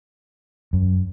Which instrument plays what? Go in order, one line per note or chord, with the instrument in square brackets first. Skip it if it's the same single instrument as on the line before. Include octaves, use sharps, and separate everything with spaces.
[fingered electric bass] F#2